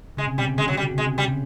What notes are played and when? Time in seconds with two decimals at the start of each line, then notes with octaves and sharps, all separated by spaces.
0.17 C#3 G#3
0.28 C3
0.38 B2 G3
0.48 C#3
0.57 D3 G#3
0.68 F#3
0.77 G3
0.91 C3
0.98 C#3 G#3
1.18 C3 G3
1.28 C#3